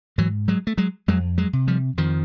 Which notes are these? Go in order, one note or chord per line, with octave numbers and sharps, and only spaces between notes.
G#2 E3 F#3
F#3 G#3
A3
F#3 G#3
F2 F#3 G#3
F#3 G#3
C3
F3 G3
F2 D#3 F3